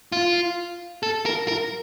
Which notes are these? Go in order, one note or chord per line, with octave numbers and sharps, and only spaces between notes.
F4
A4
A#4
A#4